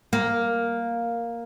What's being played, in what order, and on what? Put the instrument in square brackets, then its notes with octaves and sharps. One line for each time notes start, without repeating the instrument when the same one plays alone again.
[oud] A#3